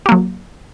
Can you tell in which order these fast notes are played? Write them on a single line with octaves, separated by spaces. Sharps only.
G4 A#3 F#3